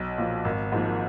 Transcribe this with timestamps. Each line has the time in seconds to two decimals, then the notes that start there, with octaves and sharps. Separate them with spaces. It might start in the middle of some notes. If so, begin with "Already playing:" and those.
Already playing: B1
0.18 A#2 F3
0.45 G#1
0.72 G#2 F3 A#3